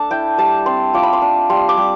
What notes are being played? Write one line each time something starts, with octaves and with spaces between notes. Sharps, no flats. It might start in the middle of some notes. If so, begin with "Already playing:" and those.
Already playing: A3 D4 A5
E4 G5
G3 A5
C4 C6
F4 D6
B5
C6
D4
G3 C6
D6
G3